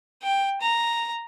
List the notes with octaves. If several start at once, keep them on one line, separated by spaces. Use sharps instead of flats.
G5
A#5